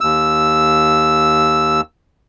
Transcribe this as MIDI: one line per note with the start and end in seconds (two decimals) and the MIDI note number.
0.01 1.81 39
0.01 1.81 88